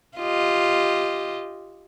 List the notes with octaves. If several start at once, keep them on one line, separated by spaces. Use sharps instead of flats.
F4 G4 D#5